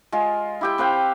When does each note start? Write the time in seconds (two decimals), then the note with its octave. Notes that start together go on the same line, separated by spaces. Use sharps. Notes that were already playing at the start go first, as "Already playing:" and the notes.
0.12 G#3 F4
0.61 E4 G4 G5
0.78 C4 B4 F5 G5